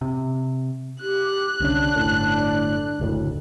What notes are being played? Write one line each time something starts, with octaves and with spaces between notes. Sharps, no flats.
C3
G4 F#6
C2 D3 C#4 D4
G1 A2
F#1 D2 A2